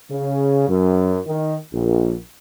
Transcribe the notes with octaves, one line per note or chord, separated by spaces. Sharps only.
C#3
F#2
D#3
A#1